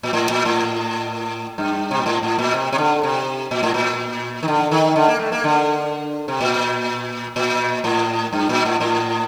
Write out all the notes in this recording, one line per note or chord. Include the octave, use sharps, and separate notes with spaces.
A#2
A2
A#2
A2
G2
C3
A#2
A2
A2
A#2
C3
C3
D3
C3
A#2
A2
A#2
D#3
D3
D#3
D3
A#3
A3
A#3
D3
C3
A#2
A#2
A2
G2
A#2
A2
A2